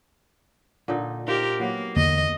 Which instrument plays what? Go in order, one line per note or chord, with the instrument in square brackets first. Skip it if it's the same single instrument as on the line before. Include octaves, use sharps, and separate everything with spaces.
[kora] A#2 D3 D#4
[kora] D#4 F4 C5 [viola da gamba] G4 A#4
[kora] F#3 B3 [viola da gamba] A#3
[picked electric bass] E2 D3 A#3 [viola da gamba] D#5